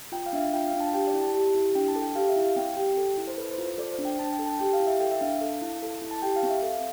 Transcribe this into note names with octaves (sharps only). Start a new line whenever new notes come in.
F4 G5
F5
D4 E5
F5
F4 G5
F5
D4
A5
G4 G5
D5
E4
A5
G4
E4
D4 G5
A5
A4
G5
G4 F5
E5
E4
F5
C4 G5
G4 G5
A4
E4
C5
A4 B4
C5
F4
C5
A4 D5
C5
D4
G5
D4 A5
G5
A4
A5
G4 G5
F5
E4
E5
A4 G5
E5
D4 F5
A4
E4
A4
E4
A5
G4 G5
F5
C4
E5
A4 F5